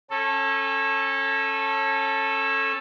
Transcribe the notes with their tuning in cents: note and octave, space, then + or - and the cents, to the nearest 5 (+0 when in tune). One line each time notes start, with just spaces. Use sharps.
C#4 -25 A4 +0